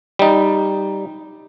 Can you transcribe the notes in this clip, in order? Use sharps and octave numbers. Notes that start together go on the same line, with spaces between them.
G3 D#4